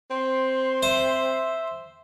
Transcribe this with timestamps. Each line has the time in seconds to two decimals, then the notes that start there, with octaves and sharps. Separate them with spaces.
0.11 C4 C6
0.83 C5 E5